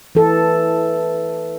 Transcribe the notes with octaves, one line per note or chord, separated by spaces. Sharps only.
E3 A4